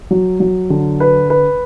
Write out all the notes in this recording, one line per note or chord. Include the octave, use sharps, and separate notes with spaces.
F#3
F#3
D3
B4
B4